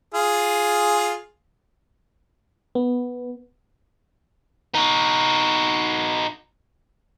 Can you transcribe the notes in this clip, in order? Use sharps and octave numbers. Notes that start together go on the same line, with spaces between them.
F4 G#4
B3
D#4 F#4